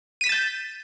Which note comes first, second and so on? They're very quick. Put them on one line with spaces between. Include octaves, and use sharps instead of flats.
D#7 B6 E7 A6 G6